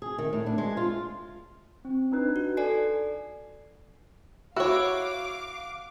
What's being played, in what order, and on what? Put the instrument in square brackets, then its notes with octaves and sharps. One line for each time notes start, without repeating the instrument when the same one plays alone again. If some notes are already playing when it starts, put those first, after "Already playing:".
[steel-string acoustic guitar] G#4
D#3
A2
D4
G#3
F4
[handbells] C4
D4 D#4 B4
[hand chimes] F#4
[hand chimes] A4 D5 G#5 [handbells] C7
[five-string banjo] E4 C#5 [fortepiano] F#4 [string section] F5 D6